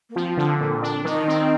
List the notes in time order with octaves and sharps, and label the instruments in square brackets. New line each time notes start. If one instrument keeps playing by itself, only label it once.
[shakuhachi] A#3
[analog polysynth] F3 [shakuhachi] C4
[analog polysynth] D3
A#2
D4
[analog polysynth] D#3 [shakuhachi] D#4
[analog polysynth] C4